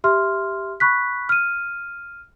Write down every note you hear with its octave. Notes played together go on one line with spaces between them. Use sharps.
G4 E5 C6 F6
B5 C#6 F#6 B6
F6 D#7